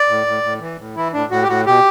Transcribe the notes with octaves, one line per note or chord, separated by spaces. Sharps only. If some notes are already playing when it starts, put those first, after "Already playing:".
Already playing: D5
A2
A2
A2
E3
A2
E3 E4
A2 D4
A2 F#4
G4
A2 F#4
B2 G4